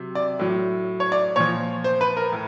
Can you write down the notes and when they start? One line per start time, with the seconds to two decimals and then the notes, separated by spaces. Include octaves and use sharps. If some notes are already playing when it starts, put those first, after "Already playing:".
Already playing: C3 F#3
0.15 D5
0.39 A2 F#3
1.00 C#5
1.12 D5
1.36 A#2 F3 C#5
1.84 C5
2.01 B4
2.17 A#4
2.32 A2